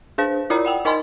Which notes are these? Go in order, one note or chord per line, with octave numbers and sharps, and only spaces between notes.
D4 G#4 C5
E4 F4 A#4 D5 A#5
D5 F#5 G5
D#4 A#4 D#5 G#5 B5 C6